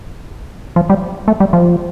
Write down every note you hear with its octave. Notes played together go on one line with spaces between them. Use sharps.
F3
G3
A3
G3
F3